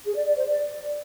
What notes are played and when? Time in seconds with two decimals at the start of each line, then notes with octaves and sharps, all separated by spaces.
0.05 G#4
0.16 D5
0.26 D5
0.36 C5
0.47 D5